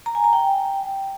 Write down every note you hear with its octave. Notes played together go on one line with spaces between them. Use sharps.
A#5
G#5
A#5
G5